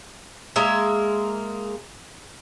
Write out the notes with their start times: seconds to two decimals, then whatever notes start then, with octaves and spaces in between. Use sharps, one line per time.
0.56 G#3 A#3 E5